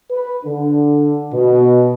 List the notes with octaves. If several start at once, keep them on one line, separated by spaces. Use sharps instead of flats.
B4
D3
B2